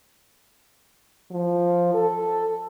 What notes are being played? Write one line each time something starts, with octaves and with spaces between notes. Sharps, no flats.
F3
A4